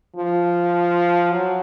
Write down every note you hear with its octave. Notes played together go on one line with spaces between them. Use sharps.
F3
F#3